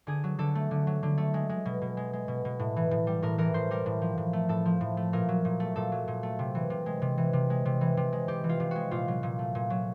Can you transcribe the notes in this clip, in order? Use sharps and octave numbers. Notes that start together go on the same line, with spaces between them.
D3 G#4
F#3
D3 A4
A3
D3
F#3
D3
A3
G#3
G#3
B2
B2
G#3
G#3
B2
B2
A2
E3
A2
G3
A2 A#4
E3 A#4
A2 C5
G3 A#4
A2
F3
A2
A3
A2 A4
F3
A2
A3
A#2 A#4
F#3
A#2
A3
A#2 A4
F#3
A#2
A3
C3
E3
C3
G#3
C3
E3
C3
G#3
C3
E3
C3
G#3
C3 G4
E3
F4
C3
G#3 F#4
A#2 F4
F#3
A#2
A3
A#2
F#3